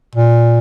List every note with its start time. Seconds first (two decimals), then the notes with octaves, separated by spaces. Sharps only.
0.15 A#2